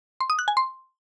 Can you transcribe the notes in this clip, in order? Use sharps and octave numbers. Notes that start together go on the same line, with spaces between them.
C6
D#6
F#6
G#5
C6